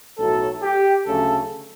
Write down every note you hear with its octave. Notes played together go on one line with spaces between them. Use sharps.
B1 A2 F#3 A4
G4
D2 C#3 F#3 A3 A4